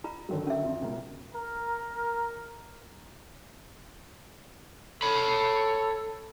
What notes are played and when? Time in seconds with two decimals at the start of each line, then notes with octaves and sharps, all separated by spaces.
0.04 F4 A#5
0.29 D3 D#3 F#3
0.47 C#4 E5
0.63 F2
0.82 C#2 B2 A#4
1.35 A#4
5.02 A4 C#5 B5